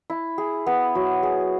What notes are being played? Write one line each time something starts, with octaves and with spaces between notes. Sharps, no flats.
E4
G#4
B3
F#3
G#4